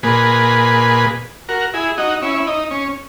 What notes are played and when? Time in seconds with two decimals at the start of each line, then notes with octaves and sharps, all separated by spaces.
0.03 A#2 G#4 B4
1.49 F#4 A#4
1.74 E4 G#4
1.98 D#4 F#4
2.22 C#4 E4
2.35 E4
2.47 D#4
2.71 C#4